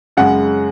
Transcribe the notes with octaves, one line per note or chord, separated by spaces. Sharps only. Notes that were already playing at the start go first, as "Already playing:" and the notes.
F#2 C#3 G#3 F#5